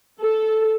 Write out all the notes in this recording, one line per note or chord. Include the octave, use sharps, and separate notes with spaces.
A4